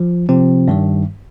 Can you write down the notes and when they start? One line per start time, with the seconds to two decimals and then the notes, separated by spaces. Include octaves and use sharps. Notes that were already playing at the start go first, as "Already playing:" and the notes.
Already playing: F3
0.29 C3 F3 C4
0.68 G2 D#3 G3